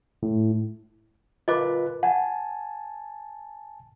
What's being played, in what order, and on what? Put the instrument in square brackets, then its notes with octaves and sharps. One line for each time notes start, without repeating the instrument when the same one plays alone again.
[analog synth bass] A2
[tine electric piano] F4 A#4 B4 [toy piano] D#5 A5 D6
[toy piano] F#5 [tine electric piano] G#5 A5